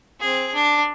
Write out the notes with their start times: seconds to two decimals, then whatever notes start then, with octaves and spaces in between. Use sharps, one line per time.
0.20 C4 G#4
0.54 D4